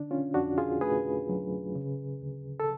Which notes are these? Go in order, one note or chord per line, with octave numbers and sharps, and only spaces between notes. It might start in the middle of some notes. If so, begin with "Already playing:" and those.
Already playing: D3 D4
C#4 F4
F2 D4 F#4
F4 G#4
A3 G#4 B4
F#3
C#3
D2
A4